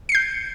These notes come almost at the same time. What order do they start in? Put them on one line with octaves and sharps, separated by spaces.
C#7 C7 G6